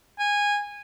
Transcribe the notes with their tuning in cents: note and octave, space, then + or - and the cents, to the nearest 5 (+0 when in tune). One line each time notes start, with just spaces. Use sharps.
G#5 -15